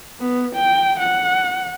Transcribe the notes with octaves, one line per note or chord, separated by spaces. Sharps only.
B3
G5
F#5